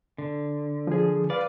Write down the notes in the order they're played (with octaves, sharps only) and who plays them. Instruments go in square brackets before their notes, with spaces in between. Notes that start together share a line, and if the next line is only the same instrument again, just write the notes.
[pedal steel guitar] D3
[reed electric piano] F3 G#4
[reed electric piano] B4 F5 [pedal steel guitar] D5